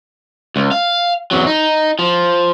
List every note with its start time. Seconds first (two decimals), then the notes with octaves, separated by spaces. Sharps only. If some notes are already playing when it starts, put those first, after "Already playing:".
0.56 C#2
0.71 F5
1.31 E2 F#3
1.47 D#4
1.99 F3